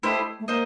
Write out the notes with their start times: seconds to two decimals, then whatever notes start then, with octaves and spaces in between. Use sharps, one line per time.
0.03 A3 E4 G4 C5 D#5
0.40 A3
0.48 A#3 C5 D#5